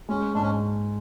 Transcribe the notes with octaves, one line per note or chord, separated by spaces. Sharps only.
G#3 C#4
G#2 D4
C#4